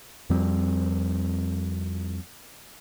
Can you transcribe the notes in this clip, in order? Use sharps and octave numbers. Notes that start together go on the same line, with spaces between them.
F2 F3 G3 C4